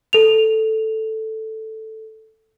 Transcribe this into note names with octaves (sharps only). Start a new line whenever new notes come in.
A4 F7